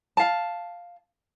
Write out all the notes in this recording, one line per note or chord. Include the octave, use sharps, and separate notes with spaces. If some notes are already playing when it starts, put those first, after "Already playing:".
F5 A5